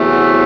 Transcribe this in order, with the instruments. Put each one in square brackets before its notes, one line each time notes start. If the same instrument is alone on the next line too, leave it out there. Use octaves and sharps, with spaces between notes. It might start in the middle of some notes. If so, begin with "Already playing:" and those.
Already playing: [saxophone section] E2 C3 F#3 A3